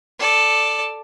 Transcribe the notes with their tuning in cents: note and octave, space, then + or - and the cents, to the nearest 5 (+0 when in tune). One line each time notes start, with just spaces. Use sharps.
A4 +0 D5 +10